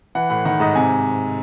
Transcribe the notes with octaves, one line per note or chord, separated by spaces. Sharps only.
E3 F#5
A2 F#5
D#3 F#5
G#2 D#5
C3 G#5